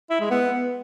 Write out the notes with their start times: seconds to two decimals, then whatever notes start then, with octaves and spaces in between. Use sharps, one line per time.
0.10 E4
0.20 G#3
0.30 B3